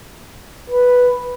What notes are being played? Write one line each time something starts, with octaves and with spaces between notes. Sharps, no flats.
B4